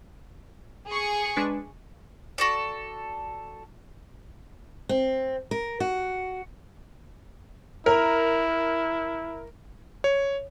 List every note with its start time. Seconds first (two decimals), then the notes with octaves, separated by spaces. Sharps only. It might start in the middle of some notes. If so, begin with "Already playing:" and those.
0.88 G#4 C#6
1.36 G#3 D4 B4
2.38 F#4 A4 D5
4.89 C4
5.51 A#4
5.80 F#4
7.86 E4 A#4
10.04 C#5